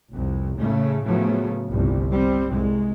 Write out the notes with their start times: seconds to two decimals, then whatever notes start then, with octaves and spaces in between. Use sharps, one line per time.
0.12 F1 C2
0.57 A2 C#3 A3
1.03 A2 C#3 F3 F#3 A3 B3
1.70 G1 C2
2.12 G3 C4
2.52 C2 G#3